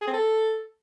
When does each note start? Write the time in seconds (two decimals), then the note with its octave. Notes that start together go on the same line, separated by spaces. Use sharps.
0.01 G#4
0.07 C4
0.13 A4